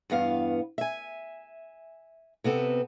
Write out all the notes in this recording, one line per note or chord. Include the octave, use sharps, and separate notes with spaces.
E2 G2 B3 F5
E5 G#5
C3 B3 C4 A4